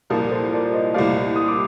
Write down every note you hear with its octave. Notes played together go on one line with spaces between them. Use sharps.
C2 A#2 F3 A#4 D5
A4 C5
A#4 D5
C5 D#5
C2 A#2 A3 D5 F5
D#6
D6